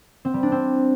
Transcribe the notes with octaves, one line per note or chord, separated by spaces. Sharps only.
C4
G3
D4
C4